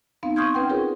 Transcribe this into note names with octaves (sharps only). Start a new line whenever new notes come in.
B3 C4 D#4 F5
C6 C#6 D#6 F6 G6 G#6
C#4 B4 F#5 G5
F4 G#4 A#4 B4 C#5